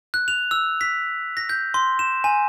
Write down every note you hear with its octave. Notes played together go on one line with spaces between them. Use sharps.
F#6
F7
E6
B6
A#6
G6
C6
E7
G#5